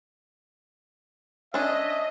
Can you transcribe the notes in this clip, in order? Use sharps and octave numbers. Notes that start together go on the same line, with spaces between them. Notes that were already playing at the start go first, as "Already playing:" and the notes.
C#4 D4 D#5 E5